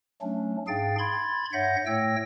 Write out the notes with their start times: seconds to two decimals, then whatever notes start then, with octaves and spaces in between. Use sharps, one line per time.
0.22 F#3 A3 C#4 D4
0.68 G#2 D4 G#4 F5 G5 A6
0.98 B5 C6 G#6 A6
1.53 G2 C#5 E5 F#5 G6 A#6
1.86 A2 A3 C#5 G5 E6 A#6